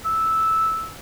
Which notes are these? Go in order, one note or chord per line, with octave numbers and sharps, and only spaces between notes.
E6